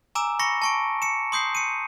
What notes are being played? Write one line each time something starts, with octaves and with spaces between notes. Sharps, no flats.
G#5 A#5 D6 E6 E7
B5 C#6 A#6 C#7
A5 C#6 D7
C#7 E7
C6 D#6 G6 C7
C#7 D#7